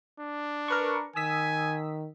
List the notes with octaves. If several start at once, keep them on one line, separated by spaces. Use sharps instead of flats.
D4
A#4 B4 C#6
D#3 G#5 D#6 E6 B6